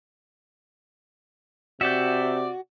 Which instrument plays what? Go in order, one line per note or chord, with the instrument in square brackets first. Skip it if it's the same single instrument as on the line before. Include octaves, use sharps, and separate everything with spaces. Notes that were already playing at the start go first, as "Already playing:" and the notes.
[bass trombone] C3 [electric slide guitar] F#4 [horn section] D5 [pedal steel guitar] E5 G5